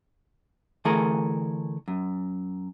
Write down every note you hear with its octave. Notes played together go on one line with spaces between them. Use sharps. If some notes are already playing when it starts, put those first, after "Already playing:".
D3 E3 A3 G#4 A#4
F#2